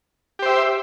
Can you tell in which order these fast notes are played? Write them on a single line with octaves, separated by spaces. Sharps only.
G4 C5 E5